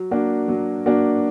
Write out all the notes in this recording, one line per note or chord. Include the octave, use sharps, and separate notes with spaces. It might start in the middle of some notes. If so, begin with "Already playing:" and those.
Already playing: F#3
A#3 D4 F#4
F#3
A#3 D4 F#4